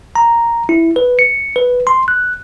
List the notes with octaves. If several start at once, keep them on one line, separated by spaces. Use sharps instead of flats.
A#5
E4
B4
C#7
B4
C6
F#6